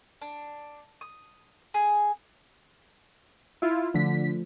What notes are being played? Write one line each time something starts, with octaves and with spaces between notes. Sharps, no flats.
D4
D#6
G#4
E4 F4
D3 F3 A3 B6